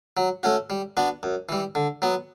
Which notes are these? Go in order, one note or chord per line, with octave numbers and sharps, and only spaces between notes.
F#3
A3 C#4 F#4
G3
B3 D4 F#4
F#2
E3 G3
D3
F#3 B3